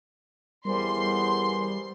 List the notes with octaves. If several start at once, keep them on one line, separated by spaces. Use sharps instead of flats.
E2 G3 A#4 C5 G#5 C6